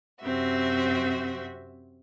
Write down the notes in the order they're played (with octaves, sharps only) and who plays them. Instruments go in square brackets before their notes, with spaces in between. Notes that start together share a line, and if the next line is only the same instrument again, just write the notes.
[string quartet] F#2 C3 C4 F#4 E5